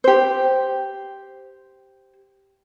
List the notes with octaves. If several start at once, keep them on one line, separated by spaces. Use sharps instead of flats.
G4 C5